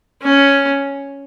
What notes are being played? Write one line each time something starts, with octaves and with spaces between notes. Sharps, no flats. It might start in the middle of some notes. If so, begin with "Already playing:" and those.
C#4